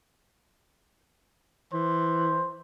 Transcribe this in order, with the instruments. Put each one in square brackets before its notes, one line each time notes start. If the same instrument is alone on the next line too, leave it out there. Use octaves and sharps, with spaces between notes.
[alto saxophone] E3 [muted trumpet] C5